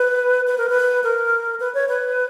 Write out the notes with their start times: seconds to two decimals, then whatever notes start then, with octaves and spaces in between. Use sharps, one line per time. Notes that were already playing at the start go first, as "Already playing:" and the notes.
Already playing: B4
0.47 B4
0.58 A#4
0.69 B4
1.04 A#4
1.60 B4
1.74 C#5
1.89 B4